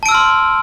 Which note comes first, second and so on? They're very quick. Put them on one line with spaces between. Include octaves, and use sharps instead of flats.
A5 D7 E6 F6 C6